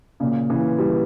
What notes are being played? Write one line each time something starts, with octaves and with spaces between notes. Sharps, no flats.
A#2 C#3
C#3 E3
E3 G3